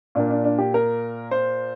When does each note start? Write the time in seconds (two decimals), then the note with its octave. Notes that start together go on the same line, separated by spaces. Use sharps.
0.15 A#2 A#3 D4
0.30 D4
0.44 D4
0.59 G4
0.74 A#4
1.31 C5